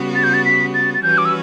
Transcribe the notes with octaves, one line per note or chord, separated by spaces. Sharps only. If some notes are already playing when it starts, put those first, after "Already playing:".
Already playing: C#3 G3 B3 F#4
A6
G6
A6
B6
A6
A6
E3 G3 C#4 F#4 B4 G6
D6
E6